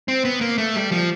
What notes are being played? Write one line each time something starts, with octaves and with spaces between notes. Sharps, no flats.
C4
B3
A#3
A3
G3
F3